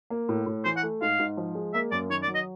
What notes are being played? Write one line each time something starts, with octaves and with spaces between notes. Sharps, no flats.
A#3
A2
A2
E3 C5
F#5
A3
G#2 F5
G#2
F3
G#3
A#3 E5
F#2 D5
D#3 C#5
D5
F#3
D#5